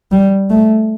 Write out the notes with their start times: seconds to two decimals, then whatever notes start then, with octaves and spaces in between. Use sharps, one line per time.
0.12 G3
0.50 A3